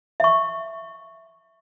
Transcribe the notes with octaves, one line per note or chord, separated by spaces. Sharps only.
E5 C#6